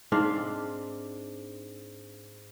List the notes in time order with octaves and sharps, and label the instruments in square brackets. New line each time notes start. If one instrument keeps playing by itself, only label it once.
[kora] G#2 C4 D4 F5